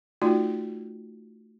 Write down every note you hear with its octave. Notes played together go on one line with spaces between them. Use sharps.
A3 D#4 F4 F#4 D5